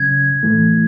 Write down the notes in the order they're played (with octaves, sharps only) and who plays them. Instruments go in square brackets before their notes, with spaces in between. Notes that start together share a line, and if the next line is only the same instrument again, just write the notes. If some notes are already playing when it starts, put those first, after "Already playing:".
Already playing: [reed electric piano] C#3 F#3 C#4 [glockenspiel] G#6
[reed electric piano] A2 E3 A3